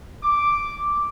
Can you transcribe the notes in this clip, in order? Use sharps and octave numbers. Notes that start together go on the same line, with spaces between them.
D6